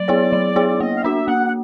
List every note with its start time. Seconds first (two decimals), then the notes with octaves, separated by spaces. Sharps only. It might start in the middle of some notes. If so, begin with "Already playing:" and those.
Already playing: F#3 D5
0.08 B3 E4 G#4 C#5
0.32 F#3
0.56 B3 E4 G#4 C#5
0.80 A#3 D#5
0.97 F5
1.04 D4 F#4 E5
1.28 A#3 F#5
1.48 F#5